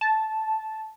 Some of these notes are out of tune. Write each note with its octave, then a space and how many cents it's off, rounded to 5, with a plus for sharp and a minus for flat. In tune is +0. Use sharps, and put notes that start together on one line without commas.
A5 -10